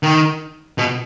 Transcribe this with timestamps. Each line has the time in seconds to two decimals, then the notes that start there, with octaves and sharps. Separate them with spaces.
0.03 D#3
0.78 B2